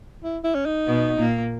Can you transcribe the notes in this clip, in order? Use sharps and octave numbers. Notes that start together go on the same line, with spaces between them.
E4
E4
C#4
D#4
B2 B3
A#2 A#3